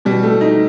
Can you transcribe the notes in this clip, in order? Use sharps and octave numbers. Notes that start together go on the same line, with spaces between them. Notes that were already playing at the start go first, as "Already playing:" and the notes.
B2 G3
A3
D#4